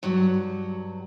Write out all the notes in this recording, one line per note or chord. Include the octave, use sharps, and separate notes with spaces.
G2 F#3